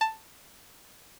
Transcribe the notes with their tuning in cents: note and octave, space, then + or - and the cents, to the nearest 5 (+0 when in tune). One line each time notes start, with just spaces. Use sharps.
A5 +10